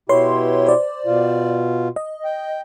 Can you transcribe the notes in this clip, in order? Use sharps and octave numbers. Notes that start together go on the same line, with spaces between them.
B2 E4 G4 B4 C#5 C6
C5 D5
B2 F4
D#5
G5